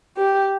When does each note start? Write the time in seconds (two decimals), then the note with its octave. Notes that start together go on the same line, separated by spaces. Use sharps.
0.17 G4